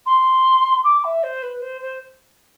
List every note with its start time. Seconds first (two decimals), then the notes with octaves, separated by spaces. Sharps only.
0.05 C6
0.83 D6
1.04 E5
1.23 C5
1.42 B4
1.61 C5
1.81 C5